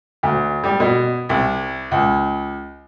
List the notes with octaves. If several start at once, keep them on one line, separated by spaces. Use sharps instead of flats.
D2
G3
B2
C2
C#2